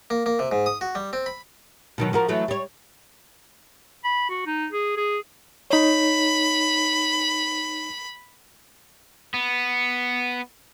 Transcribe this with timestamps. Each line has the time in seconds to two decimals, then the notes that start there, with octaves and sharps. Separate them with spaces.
0.10 A#3
0.26 A#3
0.39 C3
0.52 G#2
0.66 D#6
0.81 F#4
0.95 G3
1.13 C4
1.26 B5
1.98 B2 D#3 F#3
2.13 F3 F#4 A#4
2.28 E3 F#3 A3
2.48 G3 C#5
4.04 B5
4.30 F#4
4.46 D#4
4.72 G#4
4.97 G#4
5.70 D#4 C#5 B5
9.34 B3